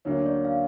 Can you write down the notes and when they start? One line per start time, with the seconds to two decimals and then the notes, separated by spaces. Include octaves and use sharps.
0.05 D2 D3 F#3 A#3 C#4 C#5
0.26 D5
0.45 F5